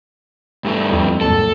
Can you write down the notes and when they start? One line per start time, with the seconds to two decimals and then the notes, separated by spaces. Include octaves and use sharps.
0.64 G2 A3
0.92 F2
1.21 C#2 F#2 A#2 A4